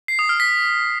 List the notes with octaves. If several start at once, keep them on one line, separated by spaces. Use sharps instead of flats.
C7
D#6
F6
B6